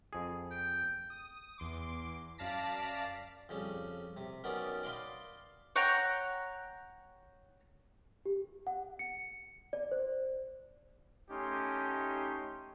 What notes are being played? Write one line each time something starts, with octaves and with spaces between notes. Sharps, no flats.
F2 G#4
G5
D#6
E2 C6 D6
F#2 D5 F5 A5 A#6 B6
F2 C#3 G3
C3
F#2 D#3 B3 C#4 D5
D5 D#5 F5 G5 B5 C6
C#5 F#5 G5 A#5
G4
F#5
C#7
D5
C5
A3 C#4 D#4 G4 C6